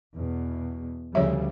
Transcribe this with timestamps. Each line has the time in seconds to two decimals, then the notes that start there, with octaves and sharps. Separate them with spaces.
0.16 E2 B2
1.15 D2 C#3 F3 G3 C#5 E5